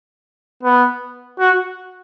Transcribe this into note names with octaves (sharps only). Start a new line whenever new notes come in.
B3
F#4